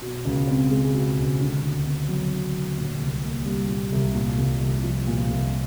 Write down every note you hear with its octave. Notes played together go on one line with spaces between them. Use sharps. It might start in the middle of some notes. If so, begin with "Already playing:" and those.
B2
C#2
C4
G#3
B2
C#2
D3
D2
B3
F#3
D3
D2
A#2
C2
A#3
G3
A#2
C2
A#2
C2
C2
F3
A#2
C2